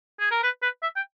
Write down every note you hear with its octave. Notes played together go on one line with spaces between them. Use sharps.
G#4
A#4
B4
B4
E5
G5